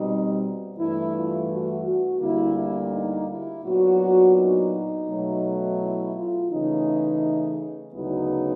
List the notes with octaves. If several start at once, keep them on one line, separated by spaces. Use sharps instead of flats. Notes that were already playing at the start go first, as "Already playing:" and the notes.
Already playing: B2 G3 C4 D#4
G2 E3 A3 E4
F4
F#4
F#4
D2 D3 G3 A#3 E4
E4
D#4
E4
A#2 F#3 B3 D4 F#4
D#4
B2 F#3 A3
E4
F4
C#3 E3 A3 D#4
D2 C#3 F#3 B3 D#4 E4